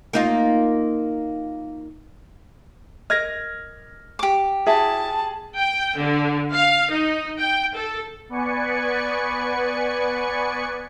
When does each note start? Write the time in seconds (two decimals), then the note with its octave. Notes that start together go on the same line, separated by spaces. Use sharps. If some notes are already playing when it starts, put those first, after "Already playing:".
0.13 A#3 D#4 F4
3.10 A#4 D#5 F6 G#6 A#6
4.19 G4 D6
4.67 E4 F#4 G#4 E5 A5
5.58 G5
5.98 D3
6.53 F5
6.92 D#4
7.39 G5
7.75 A4
8.29 B3 B4 D5 G#5 C#6 C#7